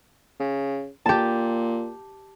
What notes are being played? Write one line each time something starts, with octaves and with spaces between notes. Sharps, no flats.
C#3
A#2 G4 A5